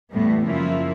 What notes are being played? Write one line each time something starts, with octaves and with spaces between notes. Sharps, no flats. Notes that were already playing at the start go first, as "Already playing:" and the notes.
E2 A2 G3 B3
F#2 C#3 F3 A#3 E4 F4